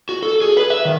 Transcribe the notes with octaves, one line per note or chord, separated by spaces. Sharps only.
F#4
A4
G#4
B4
E5
D#3